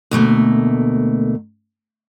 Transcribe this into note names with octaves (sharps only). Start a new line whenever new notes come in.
D2 B2 A3 A#3